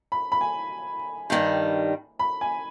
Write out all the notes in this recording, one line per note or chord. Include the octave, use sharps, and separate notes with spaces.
B5
B5
G#5
G2 D#3 G3
B5
G#5